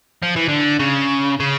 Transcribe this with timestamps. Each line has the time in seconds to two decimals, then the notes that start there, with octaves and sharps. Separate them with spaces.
0.22 F3
0.36 E3
0.48 D3
0.79 C#3
1.40 C#3